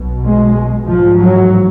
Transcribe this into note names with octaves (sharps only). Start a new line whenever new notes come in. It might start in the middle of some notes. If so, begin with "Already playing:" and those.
Already playing: B1 B2
G#3
A1 G#2 F3
F#3